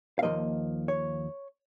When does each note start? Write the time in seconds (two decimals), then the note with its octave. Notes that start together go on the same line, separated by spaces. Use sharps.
0.19 F5
0.22 D#2 C#3 F3 A#3 D#5
0.88 C#5